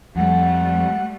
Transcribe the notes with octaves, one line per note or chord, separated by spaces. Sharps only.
F2 G3 A3 F#5